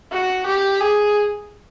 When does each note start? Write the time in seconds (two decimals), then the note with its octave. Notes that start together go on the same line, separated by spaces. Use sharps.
0.12 F#4
0.46 G4
0.81 G#4